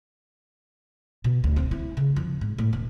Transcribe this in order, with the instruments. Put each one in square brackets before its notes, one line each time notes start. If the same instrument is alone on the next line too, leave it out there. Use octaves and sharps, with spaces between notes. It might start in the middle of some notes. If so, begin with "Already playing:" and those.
[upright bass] B2
D2
C4
E4
C#3
F2
G#2
A2
E1